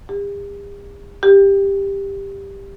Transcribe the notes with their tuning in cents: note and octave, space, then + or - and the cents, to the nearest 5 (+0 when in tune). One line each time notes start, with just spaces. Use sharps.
G4 +45
G4 +10